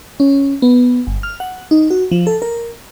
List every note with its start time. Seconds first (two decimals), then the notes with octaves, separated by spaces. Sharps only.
0.20 C#4
0.62 B3
1.07 G1
1.23 F6
1.40 F#5
1.71 D#4
1.90 F#4
2.11 F3
2.27 A4
2.42 A#4